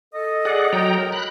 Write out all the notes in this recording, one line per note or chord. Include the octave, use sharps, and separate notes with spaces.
A4 D#5
G#4 D5 F#5
F#3 G5 A#5
A#4
B5 F#6